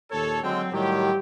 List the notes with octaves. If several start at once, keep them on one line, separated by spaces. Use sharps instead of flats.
D#2 A#2 A4 C#5
D3 F#3 G#3 C4 G5
A2 D#3 F#3 G3 G4